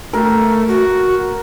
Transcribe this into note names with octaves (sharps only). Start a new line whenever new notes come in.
A3 A#4
F#4